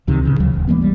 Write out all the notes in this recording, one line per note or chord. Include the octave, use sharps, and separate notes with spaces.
C#2 C3 D#3
A1 C#3 E3
D2 C#3 E3 F#3
D#1
E3 G#3 A#3 B3
G#1 G3